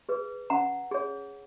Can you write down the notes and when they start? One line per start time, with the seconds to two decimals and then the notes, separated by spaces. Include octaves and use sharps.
0.09 G#4 B4
0.50 C#4 F#5 A#5
0.91 G#4 C#5